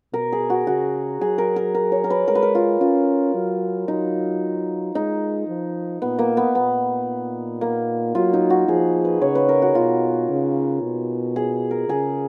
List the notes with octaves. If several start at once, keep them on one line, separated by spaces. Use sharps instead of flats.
B2 A#4
G#4
F#4
C#3 F#4
F#3 G#4
A#4
A#4
A#4
C#5
A#4
B4
G#3 A#4
B4
A#4
F4
C#4 F4
F#3
F#3 D#4
G#3 D#4
F3
A#2 B3
A#3
B3
A#2 B3
A#3
F#3 F4
D#4
F#4
F3 G#4
B4
C#3 C#5
B4
A#4
F#4
B2 F4
C#3
B2
G#4
A#4
C#3 G#4